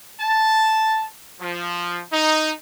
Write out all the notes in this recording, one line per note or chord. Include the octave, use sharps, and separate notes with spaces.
A5
F3
D#4